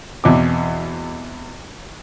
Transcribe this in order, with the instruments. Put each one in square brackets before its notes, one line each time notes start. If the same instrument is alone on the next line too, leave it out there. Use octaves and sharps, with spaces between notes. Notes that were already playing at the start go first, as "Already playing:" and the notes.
[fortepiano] E2 B2 C4 D6